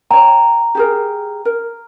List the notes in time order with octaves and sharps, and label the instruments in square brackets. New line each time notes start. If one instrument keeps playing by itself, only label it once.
[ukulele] C#5 G5 [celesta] A#5
[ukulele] G4 G#4 A#4
A#4